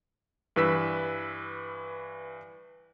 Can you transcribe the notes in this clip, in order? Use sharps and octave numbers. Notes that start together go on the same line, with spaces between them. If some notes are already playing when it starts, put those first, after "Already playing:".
G2 E3 B4 E6 B6